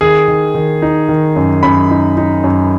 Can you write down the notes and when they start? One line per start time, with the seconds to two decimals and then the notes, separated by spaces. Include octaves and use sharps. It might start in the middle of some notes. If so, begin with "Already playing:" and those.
0.01 D#3 G#4
0.28 D#3
0.55 D#3
0.82 D#4
1.09 D#3
1.36 F#2
1.63 F#2 B5
1.91 D#4
2.17 D#4
2.44 F#2